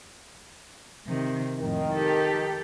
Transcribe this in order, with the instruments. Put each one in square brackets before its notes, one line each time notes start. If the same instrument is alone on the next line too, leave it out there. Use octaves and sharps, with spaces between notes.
[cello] C3 D#3
[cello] F2 A2 [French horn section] D#3
[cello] G4 A4